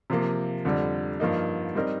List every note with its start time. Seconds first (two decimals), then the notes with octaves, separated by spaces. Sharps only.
0.10 C3 F3 A#3
0.65 F2 D3 G3
1.20 G2 F3 A#3 D#4
1.75 G3 C4 D#4 A#4